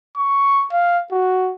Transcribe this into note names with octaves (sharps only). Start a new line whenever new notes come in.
C#6
F5
F#4